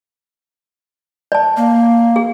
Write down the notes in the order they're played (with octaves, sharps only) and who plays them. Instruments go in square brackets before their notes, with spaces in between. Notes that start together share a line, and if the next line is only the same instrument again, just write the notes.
[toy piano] D5 A5
[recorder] A#3
[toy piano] G#4